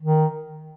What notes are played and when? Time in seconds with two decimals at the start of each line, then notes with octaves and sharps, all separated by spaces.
0.02 D#3